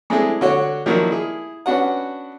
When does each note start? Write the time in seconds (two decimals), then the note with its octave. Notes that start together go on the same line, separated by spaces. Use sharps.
0.10 G#3 A3 C4 D4 E4 G#4
0.41 D3 F#4 C#5
0.86 D#3 F3 F#3 A#3 D4 E4
1.10 E4 G#4
1.66 B3 C#4 D4 F#4 F#5